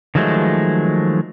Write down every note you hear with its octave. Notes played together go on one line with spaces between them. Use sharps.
D#3 F3 F#3 G#3 A3